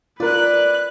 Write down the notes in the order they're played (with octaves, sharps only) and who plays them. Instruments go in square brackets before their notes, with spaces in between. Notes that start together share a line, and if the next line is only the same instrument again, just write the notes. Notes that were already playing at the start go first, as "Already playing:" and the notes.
[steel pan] F4 A#4 [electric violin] B4 F#6 [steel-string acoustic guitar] D5